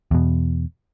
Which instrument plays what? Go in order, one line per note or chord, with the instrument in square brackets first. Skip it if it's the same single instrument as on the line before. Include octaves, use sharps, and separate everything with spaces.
[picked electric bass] E2 B2